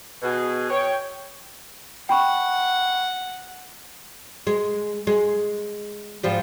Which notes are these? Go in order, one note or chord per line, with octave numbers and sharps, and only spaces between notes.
B2 G#4
C#5 G5
F#5 G5 B5 C#6
G#3
G#3
G#2 F3 G3